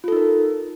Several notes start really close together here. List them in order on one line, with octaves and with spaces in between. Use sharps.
F4 A4 D#4 A#4